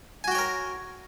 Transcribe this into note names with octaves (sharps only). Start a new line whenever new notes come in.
F#4 A#4 C#5 G5 G#5